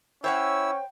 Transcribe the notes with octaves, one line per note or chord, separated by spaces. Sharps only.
C#4 E4 C5 C#5 F#5 G5 E6